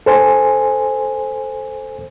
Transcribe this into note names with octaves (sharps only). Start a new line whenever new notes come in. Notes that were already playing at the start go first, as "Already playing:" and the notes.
A4 C5 G#5